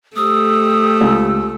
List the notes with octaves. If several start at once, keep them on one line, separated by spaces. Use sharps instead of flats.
A3 G4 C5 D#6 E6
C#2